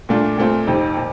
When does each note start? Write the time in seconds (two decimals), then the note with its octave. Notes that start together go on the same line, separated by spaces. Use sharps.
0.09 A#2 A3 D4 F4
0.38 A#2 A3 C4 F4
0.67 F2 C3 D#3
0.97 A#2